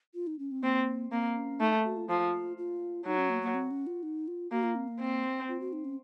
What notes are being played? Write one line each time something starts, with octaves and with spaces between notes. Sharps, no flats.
F4
D#4
C#4
C4
A#3 C4
A#3 C4
C#4
A3 D#4
F#4
F4
F3 F4
F4
F#3 D#4
C#4
A#3
A#3
C4
C#4
F4
D#4
F4
A#3 F#4
F4
C4
A#3
C4
F4
F#4
D#4
C#4